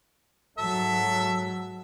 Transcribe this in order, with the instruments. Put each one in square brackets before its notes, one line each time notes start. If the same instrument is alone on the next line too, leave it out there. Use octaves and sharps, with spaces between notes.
[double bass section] G#2 F#3 [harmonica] A4 E5